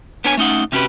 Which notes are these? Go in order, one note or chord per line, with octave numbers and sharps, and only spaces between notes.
B3 D4 C#5 G#5
A3 C#4 D#4 F#5
C3 C#4 F#4 G4 B4